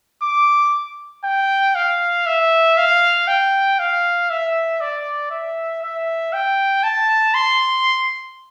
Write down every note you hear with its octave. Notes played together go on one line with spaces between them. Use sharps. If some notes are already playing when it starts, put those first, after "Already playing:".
D6
G5
F5
E5
F5
G5
F5
E5
D5
E5
E5
G5
A5
C6